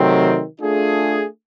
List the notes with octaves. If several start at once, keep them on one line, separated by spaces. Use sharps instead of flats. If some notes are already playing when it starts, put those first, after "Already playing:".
Already playing: C3 D#3 F#3 A3 C4
A3 D4 F4 G#4